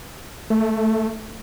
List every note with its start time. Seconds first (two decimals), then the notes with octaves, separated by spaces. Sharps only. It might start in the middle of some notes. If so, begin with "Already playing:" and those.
0.50 A3
0.60 A3
0.71 A3